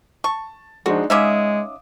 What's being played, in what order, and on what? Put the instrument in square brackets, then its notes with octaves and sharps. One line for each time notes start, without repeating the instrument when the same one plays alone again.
[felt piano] A5 [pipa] C#6
[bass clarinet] F3 [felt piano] G#3 D4 D#4 [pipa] F#4
[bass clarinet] G#3 [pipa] C#4 D#4 E5 [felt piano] F5 D6 D#6